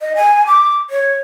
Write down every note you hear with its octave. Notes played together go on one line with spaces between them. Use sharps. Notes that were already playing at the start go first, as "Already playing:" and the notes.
D#5
G#5
D6
C#5